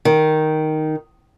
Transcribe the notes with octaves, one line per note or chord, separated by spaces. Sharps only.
D#3